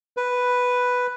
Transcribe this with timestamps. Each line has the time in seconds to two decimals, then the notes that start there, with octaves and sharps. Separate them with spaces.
0.17 B4